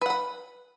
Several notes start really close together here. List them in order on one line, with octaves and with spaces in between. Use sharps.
B4 F#5 B5